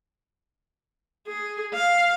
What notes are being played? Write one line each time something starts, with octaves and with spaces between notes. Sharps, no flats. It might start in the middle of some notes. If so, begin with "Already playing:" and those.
G#4
F5